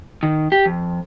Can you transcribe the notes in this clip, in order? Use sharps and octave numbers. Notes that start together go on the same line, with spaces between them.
D#3
G4
F2